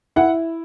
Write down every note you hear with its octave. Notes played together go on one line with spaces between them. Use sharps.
E4 F#5